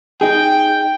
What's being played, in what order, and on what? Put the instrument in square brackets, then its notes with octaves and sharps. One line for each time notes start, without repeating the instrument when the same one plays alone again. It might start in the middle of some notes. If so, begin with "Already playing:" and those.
[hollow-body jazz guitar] D#4 G#4 [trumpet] G5